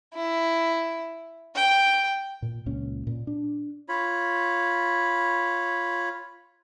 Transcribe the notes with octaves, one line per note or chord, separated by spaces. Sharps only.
E4
G5
A#2
C#2 A#2 C#4
A#2
D4
F4 C#5 B5